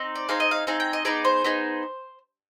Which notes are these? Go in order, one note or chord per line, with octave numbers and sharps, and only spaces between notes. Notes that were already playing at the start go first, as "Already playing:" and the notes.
Already playing: C4 D#4
D5
C4 D#4 G#4 F5
D#5
F5
C4 D#4 G#4 F5
G5
D#5
B3 D#4 G#4 D5
C5
B3 D#4 G#4